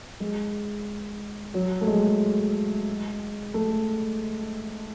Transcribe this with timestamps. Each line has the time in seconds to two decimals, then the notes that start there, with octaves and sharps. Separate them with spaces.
0.20 G#3
1.54 F#3
1.81 A3
1.87 G#3
3.54 A3